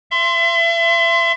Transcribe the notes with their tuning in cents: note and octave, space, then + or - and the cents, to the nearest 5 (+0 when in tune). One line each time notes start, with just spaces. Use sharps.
E5 +35 C6 +0